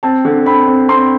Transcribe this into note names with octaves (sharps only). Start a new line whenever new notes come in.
C4 A5
D3
C4 B5
C4
C4 C6